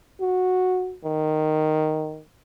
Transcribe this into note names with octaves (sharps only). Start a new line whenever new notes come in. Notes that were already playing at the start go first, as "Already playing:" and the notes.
F#4
D#3